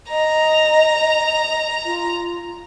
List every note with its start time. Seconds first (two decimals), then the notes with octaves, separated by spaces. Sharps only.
0.10 D#5 A#5
1.85 F4